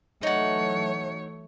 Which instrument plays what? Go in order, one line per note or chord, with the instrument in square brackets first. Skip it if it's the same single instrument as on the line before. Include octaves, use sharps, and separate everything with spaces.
[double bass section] E3 F#3 A3 [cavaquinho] D#4 F#5 [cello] C#5